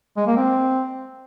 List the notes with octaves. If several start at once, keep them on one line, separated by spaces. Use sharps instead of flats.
G#3
A#3
C4